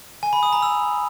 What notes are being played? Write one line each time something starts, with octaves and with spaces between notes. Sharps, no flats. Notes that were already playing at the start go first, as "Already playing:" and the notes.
G#5
B5
D#6
A#5
E6